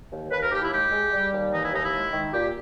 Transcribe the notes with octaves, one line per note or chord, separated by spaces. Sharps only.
D#2
D#2 B4
A#4
D#2 G4
E4
G#3 G4
G#3
G3
D#2
E3 D#4
E4
D#2 D#4
E4
G#3
D#3
A#2 G4